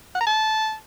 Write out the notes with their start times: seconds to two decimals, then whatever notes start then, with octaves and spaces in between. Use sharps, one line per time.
0.15 F#5
0.21 A#5
0.27 A5